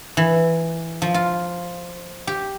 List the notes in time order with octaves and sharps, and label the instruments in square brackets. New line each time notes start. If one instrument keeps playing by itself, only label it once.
[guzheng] E3
F3
F4
G4